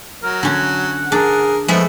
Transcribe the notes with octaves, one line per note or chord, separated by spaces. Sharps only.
F#3 A#4
D3 C#4 F#5
D4 G#4 A#4
F3 G#3 A3 B3 E5